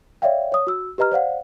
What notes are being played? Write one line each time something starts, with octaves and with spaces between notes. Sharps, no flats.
C#5 D5 E5 F5 G5
C#5 D#6
F#4 E6
G4 B4 D#5 A#5 F6
C5 D5 F5 F#5